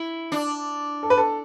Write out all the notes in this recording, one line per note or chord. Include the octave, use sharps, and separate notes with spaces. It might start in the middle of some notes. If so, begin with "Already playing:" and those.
Already playing: E4
D4
A4
B4
A4